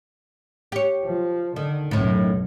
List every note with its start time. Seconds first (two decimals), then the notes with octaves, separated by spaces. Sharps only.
0.72 G4 C#5
1.04 F3
1.56 D3 D#3
1.91 B1 F#2 A2 D#3